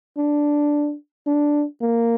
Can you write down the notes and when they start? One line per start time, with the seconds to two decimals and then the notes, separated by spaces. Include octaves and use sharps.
0.18 D4
1.27 D4
1.81 A#3